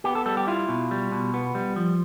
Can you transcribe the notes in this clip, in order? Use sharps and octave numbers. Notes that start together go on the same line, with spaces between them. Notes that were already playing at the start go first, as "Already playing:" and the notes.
B3 G4
A4
G3 A4
G4
E4 F4
B2
G3
B2
B3
G3
F3